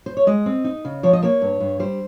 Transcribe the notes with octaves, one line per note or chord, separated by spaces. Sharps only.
C5
C#5
G#3 D#5
C4
D#4
C#3
F3 C#5
D#5
A#3 C#5
G2
G2
G3 C5